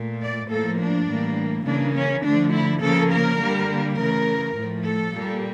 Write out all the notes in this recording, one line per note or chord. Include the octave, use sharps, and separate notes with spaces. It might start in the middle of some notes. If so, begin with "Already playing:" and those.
Already playing: A#2 A3
D5
A2 F3 A#3 A4
D4
A2 E3 G3 A#3
C#3 E3 A#3 D4
C#4
D3 F3 A3 D4
E4
C#3 F3 A#3 A4
A#4
D3 G3 A#3
C#3 E3 A3 A#4
A2 F3 A3
A4
A#2 G3 A#3